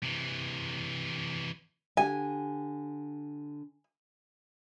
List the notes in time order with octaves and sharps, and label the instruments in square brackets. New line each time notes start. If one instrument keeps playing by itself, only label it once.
[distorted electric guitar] C3 E3
[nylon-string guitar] D3 G4 [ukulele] G#5